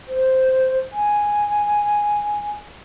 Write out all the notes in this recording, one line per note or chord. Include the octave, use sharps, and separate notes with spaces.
C5
G#5